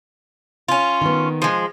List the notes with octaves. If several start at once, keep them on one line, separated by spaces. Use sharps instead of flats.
C#4 F4
D#3 B3
F3 G#3